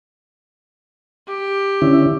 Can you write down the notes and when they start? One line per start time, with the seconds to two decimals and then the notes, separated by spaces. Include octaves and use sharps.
1.28 G4
1.82 D3 C#4 E4